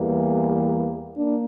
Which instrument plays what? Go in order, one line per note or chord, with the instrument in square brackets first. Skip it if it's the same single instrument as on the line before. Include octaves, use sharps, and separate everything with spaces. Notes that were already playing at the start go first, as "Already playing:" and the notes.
Already playing: [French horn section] E2 E3 G3 A#3
A#3 D4